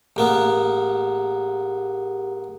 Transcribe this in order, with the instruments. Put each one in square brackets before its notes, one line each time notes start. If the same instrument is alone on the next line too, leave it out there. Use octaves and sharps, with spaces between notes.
[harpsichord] A1 A#3 B3 [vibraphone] G4 G#4 F#5